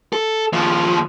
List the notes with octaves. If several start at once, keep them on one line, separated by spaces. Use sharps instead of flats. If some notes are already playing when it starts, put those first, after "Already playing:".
A4
D#2 F3